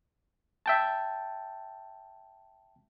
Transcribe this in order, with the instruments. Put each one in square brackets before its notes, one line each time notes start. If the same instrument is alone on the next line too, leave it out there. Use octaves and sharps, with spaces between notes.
[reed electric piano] E5 G5 A5